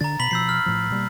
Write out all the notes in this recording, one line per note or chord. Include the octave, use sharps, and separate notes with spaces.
D3 D4 A#5 A6
B2 B5 B6 F#7
B2 F3 E6 G6 C7
F6
A2 F3
B2 G3 A#3